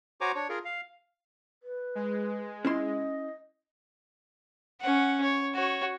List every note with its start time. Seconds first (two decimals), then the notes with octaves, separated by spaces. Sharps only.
0.21 F#4 C5 C#5 G#5 A#5 D6
0.35 D4 C#5
0.49 F4 G#4 A#4
0.65 F5
1.63 B4
1.95 G#3
2.65 C#4 E4 D#5 C6
4.81 C#4 F#5
5.22 C#5
5.53 F#4 C#5